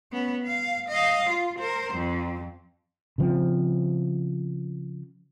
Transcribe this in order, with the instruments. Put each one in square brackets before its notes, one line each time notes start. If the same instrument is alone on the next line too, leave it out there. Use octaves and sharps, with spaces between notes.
[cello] B3 C#4
F5
D#5 F5
F4
A#4 C5
F2
[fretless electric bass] C#3 F3 C4